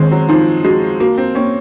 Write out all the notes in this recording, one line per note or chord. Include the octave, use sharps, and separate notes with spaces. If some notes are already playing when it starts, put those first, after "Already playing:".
Already playing: D#3 G#3 C4 C#4
F#3
F3 D#4
G#3 F#4
A#3 F#4
C4
A#3 C#4